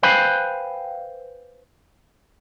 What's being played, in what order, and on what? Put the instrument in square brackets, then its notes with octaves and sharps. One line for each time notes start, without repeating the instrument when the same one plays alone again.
[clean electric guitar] B4 C5 F5 G5 G#5 B5